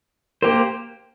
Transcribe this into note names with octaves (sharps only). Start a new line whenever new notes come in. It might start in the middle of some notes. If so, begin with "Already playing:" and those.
A#3 G4 A#4 C5